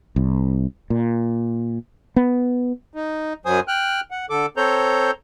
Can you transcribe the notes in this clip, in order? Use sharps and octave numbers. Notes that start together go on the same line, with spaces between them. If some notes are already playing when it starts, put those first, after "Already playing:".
C2
A#2
B3
D#4
F#2 F#3 C5 G#5 D#6
G5 F6 F#6
F#5
D3 A4 D6
C4 A4 C5 C#5 A#5 G6